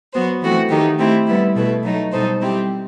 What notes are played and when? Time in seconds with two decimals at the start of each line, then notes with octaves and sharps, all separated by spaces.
0.13 F#3 B3 F#4 C5
0.42 E3 A3 C4 F#4
0.70 D#3 A3 D#4 G4
0.99 A3 C4 E4 G4
1.27 G3 B3 E4
1.55 B2 A3 E4 B4
1.83 F#3 A3 D#4
2.12 B2 G3 D#4 A4 C5
2.41 G3 C4 E4 G4